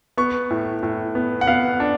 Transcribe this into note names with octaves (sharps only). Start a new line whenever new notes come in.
B3 C#6
A2
A2
B3
F#5
B3 F5
D4